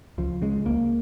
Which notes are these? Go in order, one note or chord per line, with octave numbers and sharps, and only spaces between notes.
C#2 F3
C#3 G#3
C#2 A#3